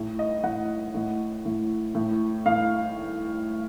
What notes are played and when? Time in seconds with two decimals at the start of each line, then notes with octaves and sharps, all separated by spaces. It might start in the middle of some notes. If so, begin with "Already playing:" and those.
Already playing: A2
0.19 D#5
0.44 A2 F#5
0.95 A2
1.45 A2
1.95 A2
2.46 A2 F5